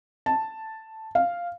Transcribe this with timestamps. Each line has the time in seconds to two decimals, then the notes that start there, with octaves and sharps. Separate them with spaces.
0.26 A5
1.15 F5